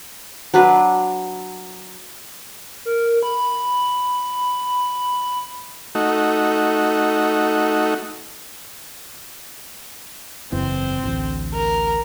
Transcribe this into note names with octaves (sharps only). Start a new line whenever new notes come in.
F#3 D4 B4
A#4
B5
A3 D#4 F#4
F#1 E2 E3 C4
A1 D2
A#4